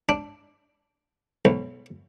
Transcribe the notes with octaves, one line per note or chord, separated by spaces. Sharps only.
D4
B1